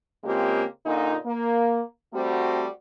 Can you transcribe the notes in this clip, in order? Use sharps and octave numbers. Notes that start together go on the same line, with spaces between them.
C#3 G#3 A#3 C4 F4 G4
A#2 D3 D#4
A#3
G3 A3 C4 F#4